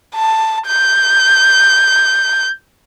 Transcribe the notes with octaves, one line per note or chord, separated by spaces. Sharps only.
A5
G6